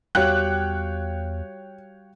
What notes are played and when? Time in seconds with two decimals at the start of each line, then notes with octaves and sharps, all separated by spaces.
0.15 E2 G3 F#4 G4 C#5 F5 G5 F#6